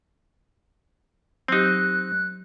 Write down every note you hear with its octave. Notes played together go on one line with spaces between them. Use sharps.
F#3 C4 D#4 G4 F#6